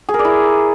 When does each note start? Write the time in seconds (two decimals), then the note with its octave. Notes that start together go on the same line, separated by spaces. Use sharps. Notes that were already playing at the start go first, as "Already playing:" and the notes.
0.09 G#4
0.14 A#4
0.19 D5
0.25 E4